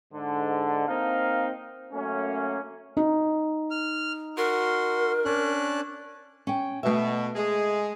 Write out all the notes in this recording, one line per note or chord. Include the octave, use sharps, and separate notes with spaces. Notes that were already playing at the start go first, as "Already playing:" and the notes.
G#2 D3
A#3 C4 D#4 A#4 F5
F#2 A3 A#3 C#4
D#4
F6
F#4 A#4 C6
C#4 D4 F#6
C#4 G5
B2 A3 E5
G#3 G#4